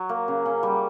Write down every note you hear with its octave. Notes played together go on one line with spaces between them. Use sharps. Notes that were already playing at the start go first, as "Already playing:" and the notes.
Already playing: F#3
A#3
C#3
C#4
G3